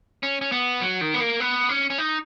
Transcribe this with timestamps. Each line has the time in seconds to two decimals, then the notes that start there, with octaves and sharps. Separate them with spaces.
0.23 C#4
0.41 C#4
0.52 B3
0.82 F#3
1.01 D#3
1.14 B3
1.21 A#3
1.40 B3
1.69 C#4
1.90 C#4
1.98 D#4